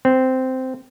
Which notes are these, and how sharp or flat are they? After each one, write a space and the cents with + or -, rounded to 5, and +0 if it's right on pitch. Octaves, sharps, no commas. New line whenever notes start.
C4 -10